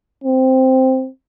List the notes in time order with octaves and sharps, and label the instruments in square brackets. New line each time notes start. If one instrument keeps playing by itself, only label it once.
[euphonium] C4